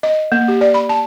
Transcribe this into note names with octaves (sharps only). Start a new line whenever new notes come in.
D#5
A#3
G4
D5
B5
A5